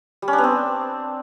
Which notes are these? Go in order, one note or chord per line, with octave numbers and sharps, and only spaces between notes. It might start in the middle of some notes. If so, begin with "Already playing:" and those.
G3
C#4
D4
B3
C4